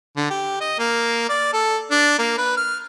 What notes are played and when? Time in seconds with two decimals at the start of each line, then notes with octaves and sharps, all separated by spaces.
0.17 D3
0.30 G4
0.61 D#5
0.79 A#3
1.29 D5
1.53 A4
1.91 D4
2.19 A#3
2.38 B4
2.57 F6